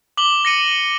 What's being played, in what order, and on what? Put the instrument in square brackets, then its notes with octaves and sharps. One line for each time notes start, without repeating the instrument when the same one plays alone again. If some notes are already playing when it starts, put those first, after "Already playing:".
[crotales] D6 F#7 G7
D6 A#6 C#7 D#7